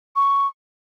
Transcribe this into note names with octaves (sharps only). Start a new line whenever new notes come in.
C#6